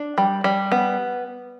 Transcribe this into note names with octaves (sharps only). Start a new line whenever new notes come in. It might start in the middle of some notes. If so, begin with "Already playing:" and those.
Already playing: D4
G3
G3
B3